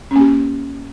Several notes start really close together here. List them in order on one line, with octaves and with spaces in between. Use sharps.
C#4 A#3 G4